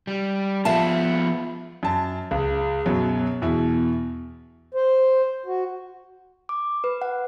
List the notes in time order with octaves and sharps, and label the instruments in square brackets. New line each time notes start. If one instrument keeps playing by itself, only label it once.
[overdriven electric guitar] G3
[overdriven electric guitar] F3 B3 [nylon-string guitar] E5 F5 A5
[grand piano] F#2 A5
C#2
F#2 B2 F#3
E2 B2 E4
[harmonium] C5
F#4
[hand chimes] D6
B4
F#5